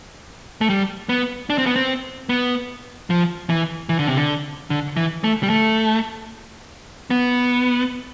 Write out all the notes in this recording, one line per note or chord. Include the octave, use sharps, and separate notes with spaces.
A3
G3
B3
D4
C4
B3
C4
B3
F3
E3
E3
D3
C3
D3
D3
E3
A3
G3
A3
B3